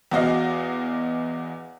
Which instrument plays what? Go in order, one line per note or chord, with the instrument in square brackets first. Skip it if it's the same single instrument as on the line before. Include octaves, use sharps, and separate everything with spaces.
[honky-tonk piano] E2 F#4 D#5 F5